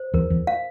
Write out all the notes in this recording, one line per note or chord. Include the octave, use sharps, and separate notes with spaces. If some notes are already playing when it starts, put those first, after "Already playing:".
Already playing: C5
E2 A#4
E2
F5